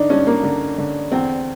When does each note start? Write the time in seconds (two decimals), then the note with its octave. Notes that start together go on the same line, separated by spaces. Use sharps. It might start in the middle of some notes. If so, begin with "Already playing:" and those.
Already playing: D3 D4 D#4
0.09 G2 C#4
0.27 A#3
0.43 D3
0.78 D3
1.12 E2 C4